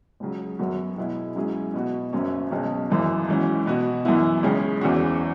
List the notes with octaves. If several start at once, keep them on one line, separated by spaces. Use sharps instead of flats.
C#2 C#3 F#3
F#2 F#3 B3 F#4
B2 G#3 B3 E4 G#4
G#2 F#3 C#4 E4 G#4
B2 B3 F#4
F#1 F#2 F#3 C#4
B1 B2 G#3 C#4
G#1 F#2 E3 B3
G#2 E3 C#4 F#4
B2 B3 F#4
F#2 E3 B3 E4
C#2 C#3 G#3 C#4
F#1 E2 E3 C#4 F#4